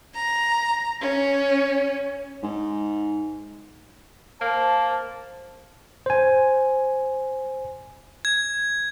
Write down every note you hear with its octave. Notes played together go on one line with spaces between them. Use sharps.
A#5
C#4
G#2
A#3 C5 A5
C5 G#5
G#6